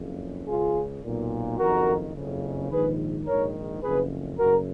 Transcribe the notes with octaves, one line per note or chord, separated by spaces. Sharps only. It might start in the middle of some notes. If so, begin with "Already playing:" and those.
Already playing: F#1 F2 C#3
C#2 C#3 F4 G#4
B1 A#2
F#1 F2 D#3 F#4 A#4
F#1 F2 C#3
A#1 G#2 D#3 G#4 B4
A#1 G#2 D#3 A#4 C#5
F#1 F2 C#3 G#4 B4
F#1 F#2 C#3 F#4 A#4